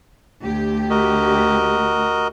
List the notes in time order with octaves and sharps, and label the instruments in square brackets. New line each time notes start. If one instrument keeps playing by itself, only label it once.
[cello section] D2 G4
[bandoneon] F#4 A#4 D#5